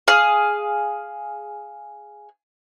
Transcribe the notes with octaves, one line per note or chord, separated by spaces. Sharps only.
G#4 F5